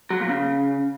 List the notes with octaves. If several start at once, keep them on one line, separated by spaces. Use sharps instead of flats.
F#3
A#2
C#3